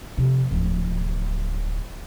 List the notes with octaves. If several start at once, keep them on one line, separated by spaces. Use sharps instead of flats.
F2 C3
D1 F3